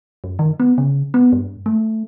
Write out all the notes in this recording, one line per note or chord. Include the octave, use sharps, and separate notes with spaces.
F#2
D#3
B3
C#3
B3
G2
A3